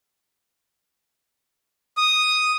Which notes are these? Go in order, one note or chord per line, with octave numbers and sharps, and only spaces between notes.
D#6